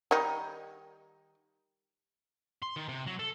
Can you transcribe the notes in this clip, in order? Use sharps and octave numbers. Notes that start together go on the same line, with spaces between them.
D#3 G3 D#4
C6
D#3
C3
F#3
A4